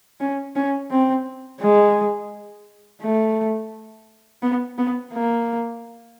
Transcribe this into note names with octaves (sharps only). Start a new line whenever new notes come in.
C#4
C#4
C4
G#3
A3
B3
B3
A#3